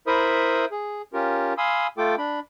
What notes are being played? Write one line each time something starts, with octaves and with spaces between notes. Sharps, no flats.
E4 A#4 C5 E5 B5 D#6
G#4
C#4 F4 G4 A#4
F5 G#5 B5 C6 D#6 E6
A3 F4 A4 G5 D6
D4 B5